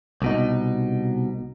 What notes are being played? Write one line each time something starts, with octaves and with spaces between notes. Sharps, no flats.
C2 B2 D#4